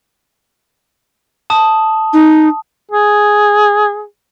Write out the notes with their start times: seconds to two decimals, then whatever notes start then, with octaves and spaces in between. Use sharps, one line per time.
1.50 A5 D#6
2.13 D#4
2.91 G#4